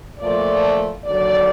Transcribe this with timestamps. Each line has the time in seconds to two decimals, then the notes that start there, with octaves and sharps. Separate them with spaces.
0.19 A#2 F3 A3 D5
1.04 D#2 D3 F#3 D5